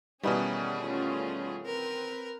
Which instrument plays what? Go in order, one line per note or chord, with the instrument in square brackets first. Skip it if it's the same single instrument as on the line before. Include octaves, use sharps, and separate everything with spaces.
[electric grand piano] B2 G3 [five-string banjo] D#3 E3 B3 [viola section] C#4 [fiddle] G#4
[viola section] A3 C#4 F4
[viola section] C4 B4 [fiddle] A#4